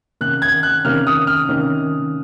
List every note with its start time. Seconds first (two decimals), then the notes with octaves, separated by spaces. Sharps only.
0.21 C3 D#3 A#3 C#4 F#6
0.42 G#6
0.63 F#6
0.85 C3 D#3 A#3 C#4 F6
1.07 D#6
1.27 F6
1.49 C3 D#3 A#3 C#4